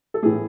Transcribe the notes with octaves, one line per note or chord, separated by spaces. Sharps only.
A4
A2 E3 A3 G#4